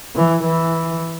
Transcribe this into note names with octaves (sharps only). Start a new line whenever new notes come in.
E3
E3